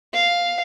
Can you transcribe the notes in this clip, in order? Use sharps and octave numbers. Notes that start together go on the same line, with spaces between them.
F5